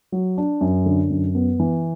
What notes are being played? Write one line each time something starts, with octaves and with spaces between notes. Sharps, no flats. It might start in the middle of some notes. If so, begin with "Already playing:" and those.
F#3
D4
F#2
D3
F#2
B3
E3